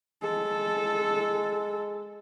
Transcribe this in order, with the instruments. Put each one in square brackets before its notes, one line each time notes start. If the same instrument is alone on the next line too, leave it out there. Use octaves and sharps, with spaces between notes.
[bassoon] G#3 [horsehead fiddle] A4